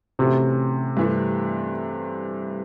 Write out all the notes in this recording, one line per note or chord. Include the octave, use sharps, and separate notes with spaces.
A2 C3 E3 A3 C#4 F#4
G2 E3 A3